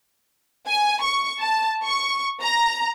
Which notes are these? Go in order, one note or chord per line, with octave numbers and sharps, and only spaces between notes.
G#5
C#6
A5
C#6
A#5